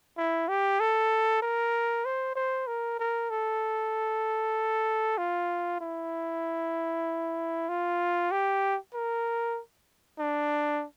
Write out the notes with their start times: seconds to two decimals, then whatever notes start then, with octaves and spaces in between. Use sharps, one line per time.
0.17 E4
0.48 G4
0.80 A4
1.42 A#4
2.05 C5
2.36 C5
2.67 A#4
2.99 A#4
3.30 A4
5.18 F4
5.81 E4
7.69 F4
8.31 G4
8.94 A#4
10.19 D4